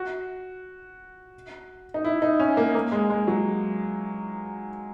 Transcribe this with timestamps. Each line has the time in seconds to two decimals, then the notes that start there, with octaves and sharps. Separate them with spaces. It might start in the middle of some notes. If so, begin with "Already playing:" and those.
Already playing: F#4
1.94 D#4
2.05 E4
2.22 D#4
2.40 C#4
2.57 A#3
2.75 A#3
2.92 G#3
3.10 G#3
3.27 F#3